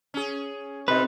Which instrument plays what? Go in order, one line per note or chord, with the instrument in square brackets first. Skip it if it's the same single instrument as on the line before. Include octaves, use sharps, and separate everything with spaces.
[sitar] C#4 G#4
[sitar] B2 [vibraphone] C4 [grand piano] D#4 A4 D#5 [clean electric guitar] B4